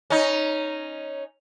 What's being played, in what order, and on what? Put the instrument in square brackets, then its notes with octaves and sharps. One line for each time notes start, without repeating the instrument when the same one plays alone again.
[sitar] C#4 D#4